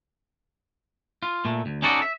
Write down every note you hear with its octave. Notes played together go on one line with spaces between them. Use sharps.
F4
A#2 A3
D2
C#4 D#4 F#4 A4 D5
E5